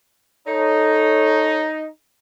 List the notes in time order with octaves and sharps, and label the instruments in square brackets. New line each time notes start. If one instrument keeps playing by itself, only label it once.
[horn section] D#4 [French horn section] A4 C#5